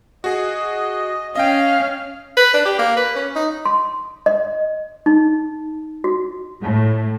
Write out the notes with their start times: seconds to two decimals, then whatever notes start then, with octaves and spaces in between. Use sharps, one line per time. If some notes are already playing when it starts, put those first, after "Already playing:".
0.24 F#4 G#4 D#5
1.36 C#4 D#5 F5 G5
2.37 B4
2.54 D4
2.66 G4
2.79 A#3
2.97 B4
3.16 C#4
3.36 D#4
3.65 C6
4.26 D#5
5.06 D#4
6.04 F#4
6.63 A2